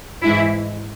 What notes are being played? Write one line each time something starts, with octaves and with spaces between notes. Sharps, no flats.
G#2 E3 G#3 E4